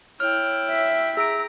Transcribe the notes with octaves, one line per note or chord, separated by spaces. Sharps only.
E4 C#5 G5 F6
E5
G#4 A#5 E6 D7